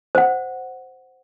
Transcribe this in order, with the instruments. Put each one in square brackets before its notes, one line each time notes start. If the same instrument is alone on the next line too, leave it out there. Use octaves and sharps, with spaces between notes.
[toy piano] C5 F#5